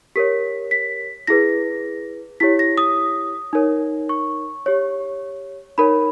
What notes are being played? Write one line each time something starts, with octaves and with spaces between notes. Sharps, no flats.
G4 A#4 C#5 B6
B6
E4 G#4 B4 A#6
E4 G4 C#5 B6
A#6
D#6
D#4 A#4 C#5
C#6
G4 C#5
D#4 A#4 C#5 B5